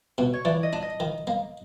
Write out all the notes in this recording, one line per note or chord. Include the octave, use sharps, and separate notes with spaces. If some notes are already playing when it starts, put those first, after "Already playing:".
B2
C#5
E3 D5
D#5
D4
D#5
D#3
A#3